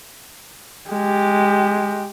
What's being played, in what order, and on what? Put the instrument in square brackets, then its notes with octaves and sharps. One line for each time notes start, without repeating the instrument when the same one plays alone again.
[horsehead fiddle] G#3 G4